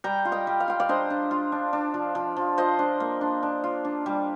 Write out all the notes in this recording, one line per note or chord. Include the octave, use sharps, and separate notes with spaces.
G3 G5 A#5
F4
D#5 G5
G3
F5
F4 G5
D5 F5
D4 C5 D#5
D4
F4
D4
D4
F3
F3
F3
F4 C5 D#5
D4
A#3
D4
D4
F4
D4
G3